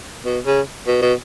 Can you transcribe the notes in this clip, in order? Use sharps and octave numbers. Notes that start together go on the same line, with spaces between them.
B2
C#3
B2
B2